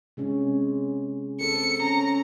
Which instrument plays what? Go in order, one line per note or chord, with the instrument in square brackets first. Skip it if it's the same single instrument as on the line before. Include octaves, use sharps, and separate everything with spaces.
[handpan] C3 G#3 C#4
[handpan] C4 A4 [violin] C#7
[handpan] C#4 [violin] A#5